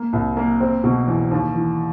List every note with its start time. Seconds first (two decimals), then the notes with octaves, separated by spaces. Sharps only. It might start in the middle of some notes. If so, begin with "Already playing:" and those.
Already playing: A#3
0.13 C2
0.37 A#3
0.60 C4
0.84 B2
1.07 E2
1.31 D#2
1.55 E3